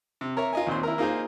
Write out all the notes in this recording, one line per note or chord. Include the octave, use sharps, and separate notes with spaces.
C3
A#4 C#5 E5 A#5
F4 D#5 G#5
D#2 A#2 C4 C6
E4 A#4
A#3 D#4 F4 G#4 C5